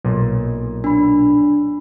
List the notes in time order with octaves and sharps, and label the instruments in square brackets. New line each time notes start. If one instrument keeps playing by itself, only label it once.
[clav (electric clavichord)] B1 A#2
[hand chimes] D4 B5